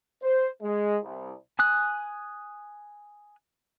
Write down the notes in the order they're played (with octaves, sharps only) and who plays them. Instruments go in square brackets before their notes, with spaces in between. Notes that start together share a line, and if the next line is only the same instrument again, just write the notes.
[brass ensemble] C5
G#3
C2
[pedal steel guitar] G#5 D#6 F#6